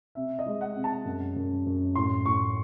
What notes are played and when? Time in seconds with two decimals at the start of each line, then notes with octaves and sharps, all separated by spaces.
0.15 C3 E5
0.39 D#5
0.46 G#3
0.61 F#5
0.76 C3
0.84 A5
1.05 F#2
1.36 F#2
1.66 F#2
1.95 A2 C6
2.25 A2 C#6